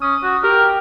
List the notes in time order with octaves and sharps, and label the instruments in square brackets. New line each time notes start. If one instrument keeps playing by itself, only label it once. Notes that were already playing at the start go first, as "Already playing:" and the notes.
[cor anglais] C#4 [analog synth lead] D#6
[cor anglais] F#4
[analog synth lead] G4 [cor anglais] A#4